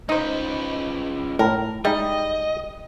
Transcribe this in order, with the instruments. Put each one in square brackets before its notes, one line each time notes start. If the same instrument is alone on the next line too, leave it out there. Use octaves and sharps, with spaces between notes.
[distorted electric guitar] C#2 B4 [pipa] D#4 C5
[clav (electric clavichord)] A2 [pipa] A#4
[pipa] G3 [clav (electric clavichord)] G#3 D#4 [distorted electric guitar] D#5